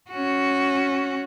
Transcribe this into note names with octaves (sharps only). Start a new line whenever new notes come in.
C#4 F#4